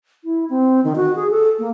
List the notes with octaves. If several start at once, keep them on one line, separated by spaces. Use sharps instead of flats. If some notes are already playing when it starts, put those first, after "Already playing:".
E4
C4
D#3
F#4
G#4
A4
A#3